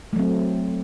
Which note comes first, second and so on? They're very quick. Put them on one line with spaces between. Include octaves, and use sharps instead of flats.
A3 F#3 C4